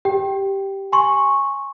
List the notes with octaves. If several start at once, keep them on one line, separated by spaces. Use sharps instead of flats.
G4 G5
G#5 C6 C#6